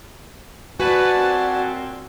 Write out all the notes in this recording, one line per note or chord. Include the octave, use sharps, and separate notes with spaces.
F#4 B4 D5 F#5 G#5 A5
A#2 F#3 C4